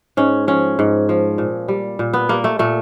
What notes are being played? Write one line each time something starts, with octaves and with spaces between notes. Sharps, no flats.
G#2 C#4
F3 C#4
G#2
F3
A#2
G3
A#2
B3
G3 A#3
A3
A#2 A3